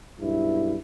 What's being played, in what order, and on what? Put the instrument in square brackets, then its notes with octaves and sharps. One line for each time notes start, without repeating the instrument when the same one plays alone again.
[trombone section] B1 G2 E4